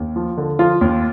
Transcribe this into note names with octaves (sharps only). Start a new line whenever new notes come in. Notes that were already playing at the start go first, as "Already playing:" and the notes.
Already playing: D#2
F3
D3
F3 F4
D#2